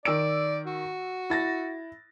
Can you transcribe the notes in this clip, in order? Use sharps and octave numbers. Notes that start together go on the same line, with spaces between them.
D#3 D5 E6 D7
F#4
E4 A6 A#6